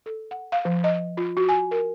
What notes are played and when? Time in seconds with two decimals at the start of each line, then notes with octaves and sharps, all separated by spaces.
0.06 A4
0.31 F#5
0.52 F5
0.65 F3
0.84 D#5
1.17 F4
1.37 F#4
1.49 G#5
1.71 A#4